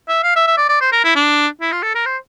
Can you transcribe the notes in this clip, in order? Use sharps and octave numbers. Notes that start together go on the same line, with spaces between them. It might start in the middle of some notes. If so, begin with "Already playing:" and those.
E5
F5
E5
E5
D5
D5
C5
A#4
E4
D4
E4
F4
A4
A#4
C5